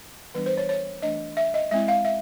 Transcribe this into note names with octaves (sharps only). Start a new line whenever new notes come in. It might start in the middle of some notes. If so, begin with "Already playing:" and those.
E3 G3 B3 D4 B4
C5
C#5
C#5
E3 A3 D4 D#5
E5
D#5
G#3 C4 E4 E5
F5
E5